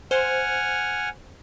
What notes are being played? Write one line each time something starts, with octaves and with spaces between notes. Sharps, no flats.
C5 F#5 G#5 F6